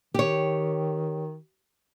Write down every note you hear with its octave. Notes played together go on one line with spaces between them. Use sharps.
D#3 G4 C#5